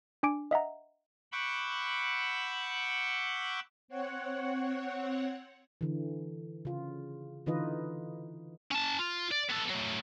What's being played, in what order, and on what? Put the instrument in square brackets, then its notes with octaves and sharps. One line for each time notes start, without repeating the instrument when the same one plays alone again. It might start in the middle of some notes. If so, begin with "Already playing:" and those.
[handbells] D4 G#5 D6 D7
D#5 E5 F#5 A#5
[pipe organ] F#5 B5 C#6 D6 E6 G6
[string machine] C4 C#5 F#5
[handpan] D3 E3
C#3 F4
D3 E3 D#4 F4 B4 D#5
[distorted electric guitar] C#4 A5
F4
D5
B3 A4
F#3 A3